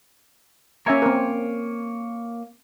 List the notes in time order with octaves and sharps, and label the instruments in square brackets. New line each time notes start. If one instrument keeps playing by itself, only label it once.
[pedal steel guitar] A#3 C#5 G#5 [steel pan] C#4 E5 A#5
[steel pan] C4 A#4